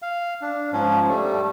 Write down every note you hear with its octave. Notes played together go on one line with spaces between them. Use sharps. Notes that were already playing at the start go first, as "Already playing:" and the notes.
F5
D4
G#2 F3 C#4
G3 A3